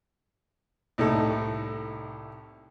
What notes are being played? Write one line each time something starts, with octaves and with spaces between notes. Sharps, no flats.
C2 A2 D#4 A4